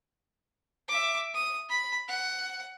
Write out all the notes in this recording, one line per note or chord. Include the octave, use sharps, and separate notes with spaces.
E5 D6
D#6
B5
F#5